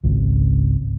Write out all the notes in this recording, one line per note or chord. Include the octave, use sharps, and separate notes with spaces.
G#1 C#2